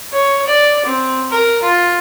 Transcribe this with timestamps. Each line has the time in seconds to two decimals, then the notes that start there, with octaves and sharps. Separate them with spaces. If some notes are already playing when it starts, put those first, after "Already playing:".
0.12 C#5
0.47 D5
0.85 C4
1.31 A#4
1.62 F4